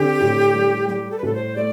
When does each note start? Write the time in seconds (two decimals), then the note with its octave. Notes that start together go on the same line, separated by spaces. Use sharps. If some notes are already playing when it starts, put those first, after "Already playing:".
Already playing: D3 C4 G4
0.21 A2
0.55 G3
0.88 G3 G4
1.11 A4
1.18 B4
1.23 A2 A4
1.34 C5
1.56 A3 D5